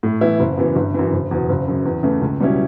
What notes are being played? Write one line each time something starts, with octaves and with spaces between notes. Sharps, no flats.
A2
E3 B3 E4
F#1
F#2 E3 B3
G1
F#2 E3
F#1
E2 B2
F#1
F#2 C#3
E2
C#3 E3 A3
C#2
B2 G3 C#4 E4